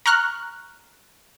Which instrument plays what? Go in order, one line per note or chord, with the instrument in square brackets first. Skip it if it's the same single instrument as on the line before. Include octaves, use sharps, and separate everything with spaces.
[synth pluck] A#5 C#6 F6 F#6